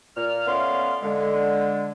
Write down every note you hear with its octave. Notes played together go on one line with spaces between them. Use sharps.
A#2 F6
A3 B3 C#4 D5 F5 C6
D3 G#3